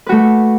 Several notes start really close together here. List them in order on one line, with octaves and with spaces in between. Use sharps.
B4 F#4 A3